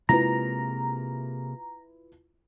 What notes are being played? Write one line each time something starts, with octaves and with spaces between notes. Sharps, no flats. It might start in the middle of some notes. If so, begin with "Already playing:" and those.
C3 G#3 A#3 E4 F4 B4 A#5